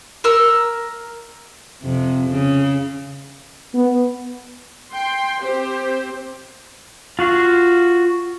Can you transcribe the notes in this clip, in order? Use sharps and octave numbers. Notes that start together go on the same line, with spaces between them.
A#4 E6
F2 C3
C#3
B3
G5 C6
C4 G4 C5
F4 F#4 F5